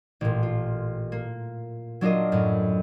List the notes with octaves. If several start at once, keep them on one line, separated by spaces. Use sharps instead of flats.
A1 A#2
F4
A#3
F#3 D4 F4 A#4 D#5
F#2 A2